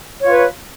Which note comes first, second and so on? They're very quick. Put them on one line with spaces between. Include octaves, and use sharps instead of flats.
C#5 F4 B4